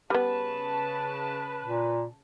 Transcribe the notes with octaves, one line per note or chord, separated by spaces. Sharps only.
C#3 G3 B3 B4 A5
A#2